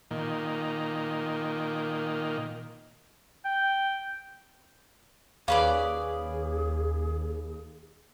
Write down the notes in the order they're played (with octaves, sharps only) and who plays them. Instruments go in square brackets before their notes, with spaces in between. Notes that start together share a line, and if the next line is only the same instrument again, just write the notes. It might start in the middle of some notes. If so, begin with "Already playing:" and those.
[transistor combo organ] A#2 D#3
[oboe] G5
[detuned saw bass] D#2 [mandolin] C#4 B4 D5 [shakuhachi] G#4 [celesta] F5